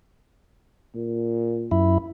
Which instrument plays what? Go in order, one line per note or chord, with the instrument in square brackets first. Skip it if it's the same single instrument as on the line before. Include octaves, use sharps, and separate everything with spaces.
[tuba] A#2
[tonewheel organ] F#2 E4